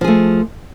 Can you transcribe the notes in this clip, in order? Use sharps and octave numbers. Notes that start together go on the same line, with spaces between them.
F3 A3 G#4